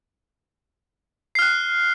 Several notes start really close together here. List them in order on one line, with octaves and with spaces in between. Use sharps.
C7 F6 F#6